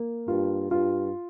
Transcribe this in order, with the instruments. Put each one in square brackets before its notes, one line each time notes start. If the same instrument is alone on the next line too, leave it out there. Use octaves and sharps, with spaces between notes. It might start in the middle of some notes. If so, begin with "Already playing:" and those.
Already playing: [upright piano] A#3
[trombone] G2 [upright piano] F4
[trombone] G2 [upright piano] F4